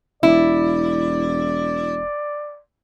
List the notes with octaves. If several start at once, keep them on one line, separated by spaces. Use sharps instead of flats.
E1 E4 D5